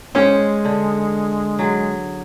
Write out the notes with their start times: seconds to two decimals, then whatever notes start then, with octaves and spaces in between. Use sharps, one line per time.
0.15 G#3 C#4 C5 F5 G5
0.65 D3
1.59 F#3 G#4